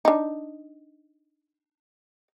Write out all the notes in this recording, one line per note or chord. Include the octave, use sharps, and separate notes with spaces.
D4 D#4